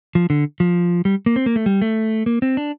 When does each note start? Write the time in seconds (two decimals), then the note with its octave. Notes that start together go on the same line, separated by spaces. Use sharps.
0.15 F3
0.30 D3
0.60 F3
1.05 G3
1.26 A#3
1.36 C4
1.46 A#3
1.56 A3
1.66 G3
1.82 A3
2.26 A#3
2.42 C4
2.57 D4